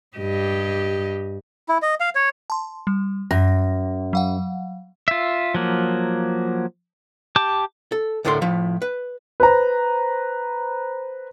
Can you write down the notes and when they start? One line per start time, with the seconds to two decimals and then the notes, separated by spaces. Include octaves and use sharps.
0.18 G2 G4 D#5
1.69 E4
1.82 D#5
2.00 F5
2.15 C#5
2.50 A5 C6
2.87 G3
3.31 F#2 A#6
4.13 F#3 F5 F#5
5.08 F4 E5
5.54 F3 F#3 A#3
7.36 G4 A5 D6
7.92 A4
8.25 D2 A2 D3 A4 A#4 C6
8.41 A2 F3 E5
8.82 B4
9.40 B4 C5 A#5